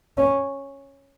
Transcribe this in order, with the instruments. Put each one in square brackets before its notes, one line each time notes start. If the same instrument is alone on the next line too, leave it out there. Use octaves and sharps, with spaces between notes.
[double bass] C#4